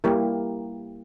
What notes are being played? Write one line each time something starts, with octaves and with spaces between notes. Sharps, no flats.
G3 A#3 E4 G4 A#4